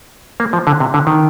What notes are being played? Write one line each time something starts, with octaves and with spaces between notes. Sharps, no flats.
A#3
F3
D3
C3
D3
D#3